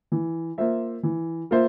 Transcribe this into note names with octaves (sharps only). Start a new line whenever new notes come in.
E3
A#3 F4 C5 E5
E3
A#3 F4 C5 E5